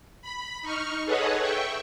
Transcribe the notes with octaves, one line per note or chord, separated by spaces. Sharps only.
B5
D#4 C#6 F6
G#4 A4 B4 C#5 D#5 F#5
E5 G5 C#6